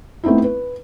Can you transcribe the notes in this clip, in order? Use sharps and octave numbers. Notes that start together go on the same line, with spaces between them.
A3 B3 C4 D#4 E4
B4